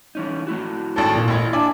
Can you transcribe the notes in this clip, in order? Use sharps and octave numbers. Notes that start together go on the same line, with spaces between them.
E3 C#4 D#4
A3 E4 F#4
G#1 A2 A5
A#2 F4
A1 E4 G#6
D4 D5 E5 G#5 A5